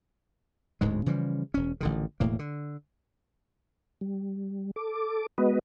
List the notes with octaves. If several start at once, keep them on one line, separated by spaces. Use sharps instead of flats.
D1 D2 G#2 G#3
C#3 E3 F3 G3
E1 C#4
A1 D3 D#3
E1 A2 A#3
D3
G3
A4 D6
G#3 B3 F#4 B4 D#5